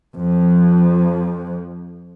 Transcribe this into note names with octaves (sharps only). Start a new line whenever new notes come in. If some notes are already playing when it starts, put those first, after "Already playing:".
F2 F3